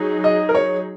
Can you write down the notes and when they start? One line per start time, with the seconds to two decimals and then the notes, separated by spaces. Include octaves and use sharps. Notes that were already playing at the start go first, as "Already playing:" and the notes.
Already playing: F#3 D#4 G#4
0.24 D#5
0.49 A#4
0.55 C#5